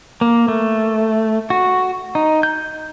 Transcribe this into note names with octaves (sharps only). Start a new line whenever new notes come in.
A#3
A3
F#4
D#4
G6